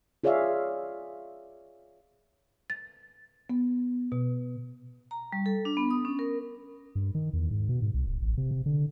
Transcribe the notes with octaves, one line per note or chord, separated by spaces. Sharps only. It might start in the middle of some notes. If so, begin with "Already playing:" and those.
F4 G#4 C#5 D5 E5 F5
A6
B3
B2
A#5
G3
A4
D4
B3
D#6
C#4
A#4
G2
D#3
E2
G#2
B2
G#2
C2
D1
A1
C3
C3
D3